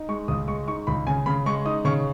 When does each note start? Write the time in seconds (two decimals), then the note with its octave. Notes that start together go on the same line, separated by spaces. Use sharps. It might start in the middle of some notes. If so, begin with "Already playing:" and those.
Already playing: D#4
0.09 G#3 C#6
0.28 C#2 D#6
0.48 G#3 C#6
0.67 D#4 C#6
0.87 C#2 B5
1.07 C#3 G#5
1.26 C#3 B5
1.46 G#3 C#6
1.65 D#4 D#6
1.85 C#3 C#6